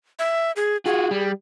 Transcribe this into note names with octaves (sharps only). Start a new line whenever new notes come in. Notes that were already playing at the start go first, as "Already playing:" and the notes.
E5
G#4
F4 F#4 G#4
G3